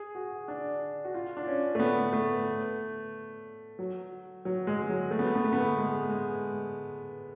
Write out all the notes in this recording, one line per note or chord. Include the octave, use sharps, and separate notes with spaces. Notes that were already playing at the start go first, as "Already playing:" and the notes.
Already playing: G#4
F#4
D4
F#4
F4
D4
C#4
A3
B3
A3
F#3
F#3
G#3
G#3
F#3
A3
B3
A3
B3
A3
B3
A3
G#3
G#3